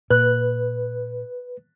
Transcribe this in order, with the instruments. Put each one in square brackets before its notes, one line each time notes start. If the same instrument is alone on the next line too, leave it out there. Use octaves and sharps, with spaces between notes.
[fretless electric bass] A#2 [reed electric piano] B4 [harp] F#6